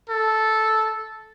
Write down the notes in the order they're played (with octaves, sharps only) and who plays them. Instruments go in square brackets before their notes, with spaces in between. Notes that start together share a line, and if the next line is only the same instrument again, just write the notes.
[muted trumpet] A4